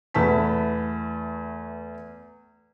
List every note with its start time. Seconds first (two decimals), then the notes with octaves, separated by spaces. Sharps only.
0.14 E2 A3 B3 A5 B6